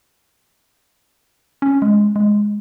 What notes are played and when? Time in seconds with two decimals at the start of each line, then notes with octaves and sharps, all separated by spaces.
1.62 C#4
1.82 G#3
2.16 G#3